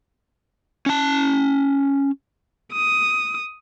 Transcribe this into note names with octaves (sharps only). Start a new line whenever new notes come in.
C#4 A5
D#6